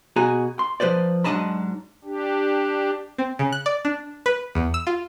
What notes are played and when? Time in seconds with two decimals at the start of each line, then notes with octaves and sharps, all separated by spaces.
0.16 B2 F#4 G#4 G#5 A#5
0.59 C6
0.80 F3 B3 B4 C5 D5
1.24 G#2 F#3 D4 D#5 A5 B5
2.04 D4 G4
3.18 C4
3.39 C#3
3.52 F#6
3.66 D5
3.85 D4
4.26 B4
4.55 E2
4.74 E6
4.87 F4